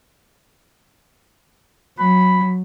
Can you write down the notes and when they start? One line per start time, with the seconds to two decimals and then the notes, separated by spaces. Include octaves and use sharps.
1.99 F#3 B5